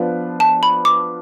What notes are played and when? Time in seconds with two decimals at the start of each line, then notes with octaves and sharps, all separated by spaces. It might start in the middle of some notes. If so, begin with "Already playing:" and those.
Already playing: F3 B3 D4 F4 B4
0.40 A5
0.63 B5
0.85 D6